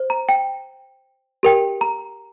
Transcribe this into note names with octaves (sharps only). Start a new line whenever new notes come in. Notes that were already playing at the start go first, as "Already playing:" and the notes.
Already playing: C5
A#5
G5
G4 A#4 G5
A#5